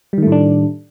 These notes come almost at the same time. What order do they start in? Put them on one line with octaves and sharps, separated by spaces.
G3 D#3 A3 A2 D4